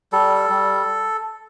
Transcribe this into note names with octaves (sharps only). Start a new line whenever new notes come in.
G3 A4
G3